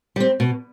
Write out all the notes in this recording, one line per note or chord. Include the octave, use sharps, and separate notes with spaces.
G3 C4
B2